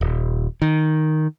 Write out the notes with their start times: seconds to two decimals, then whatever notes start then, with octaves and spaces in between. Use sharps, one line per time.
0.01 D#1
0.62 D#3